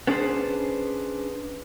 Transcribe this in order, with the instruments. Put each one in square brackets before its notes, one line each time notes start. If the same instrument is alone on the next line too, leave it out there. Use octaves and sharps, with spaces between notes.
[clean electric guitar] B3 C#4 D4 G#4 B4 C5